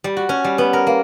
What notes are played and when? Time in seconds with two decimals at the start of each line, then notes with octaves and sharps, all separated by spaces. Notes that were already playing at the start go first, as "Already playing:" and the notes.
0.04 G3
0.17 F#4
0.29 C#4
0.44 G3
0.58 B3
0.73 A#4
0.87 A#3